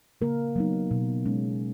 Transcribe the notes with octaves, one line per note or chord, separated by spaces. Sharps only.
C#3 A#3 A#4
F#3 B3 D#4
B2
G#3 C#4